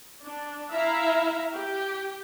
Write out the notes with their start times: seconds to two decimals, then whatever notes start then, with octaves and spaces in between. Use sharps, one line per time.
0.21 D4
0.72 E4 E5 F5 A#5
1.53 G4